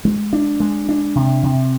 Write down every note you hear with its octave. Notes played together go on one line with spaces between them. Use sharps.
G#3
D4
G#3
D4
C3
C3